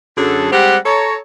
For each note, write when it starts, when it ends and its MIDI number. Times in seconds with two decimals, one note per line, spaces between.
0.17 0.51 42
0.17 0.51 50
0.17 0.51 54
0.17 0.51 68
0.17 0.51 69
0.52 0.77 55
0.52 0.77 56
0.52 0.77 60
0.52 0.77 67
0.52 0.77 78
0.85 1.17 69
0.85 1.17 73
0.85 1.17 82